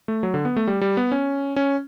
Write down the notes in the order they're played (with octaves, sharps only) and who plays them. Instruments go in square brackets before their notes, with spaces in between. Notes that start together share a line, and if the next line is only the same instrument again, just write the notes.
[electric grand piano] A3
F#3
D3
B3
A3
G3
G3
B3
C#4
C#4